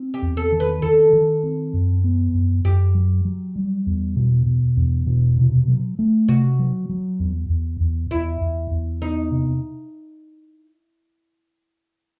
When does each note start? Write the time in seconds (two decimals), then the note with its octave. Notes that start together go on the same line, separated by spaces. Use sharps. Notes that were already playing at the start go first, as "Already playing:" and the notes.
Already playing: C4
0.14 G4
0.22 E2
0.37 A4
0.52 D#3
0.60 B4
0.82 D#3 A4
1.13 D#3
1.43 C4
1.73 F#2
2.04 B3
2.34 F#2
2.65 F#2 G4
2.95 F#3
3.25 F#3
3.56 G3
3.86 E2
4.16 B2
4.46 B2
4.77 E2
5.07 B2
5.38 C3
5.68 F#3
5.99 A3
6.29 C3 F#4
6.59 F#3
6.89 F#3
7.20 E2
7.49 E2
7.80 E2
8.10 E2 E4
8.41 E2
8.71 E2
9.02 B3 D#4
9.31 C3